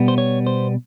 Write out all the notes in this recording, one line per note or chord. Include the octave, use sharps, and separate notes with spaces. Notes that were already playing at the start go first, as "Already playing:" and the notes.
Already playing: B2 G3 B3
C5
C#5
C5